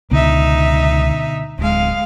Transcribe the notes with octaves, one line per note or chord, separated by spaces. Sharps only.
C#2 B2 D3 B3 D#4 E5
D1 G#3 F5